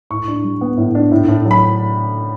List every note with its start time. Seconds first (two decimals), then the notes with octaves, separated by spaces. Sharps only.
0.10 A2 C#6
0.28 D4
0.44 G3
0.61 B3
0.77 A2
0.95 D4
1.12 A2
1.28 A2
1.46 F#3
1.51 B5